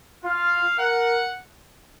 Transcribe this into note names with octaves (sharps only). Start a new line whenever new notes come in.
F4 F5
A#4 F#5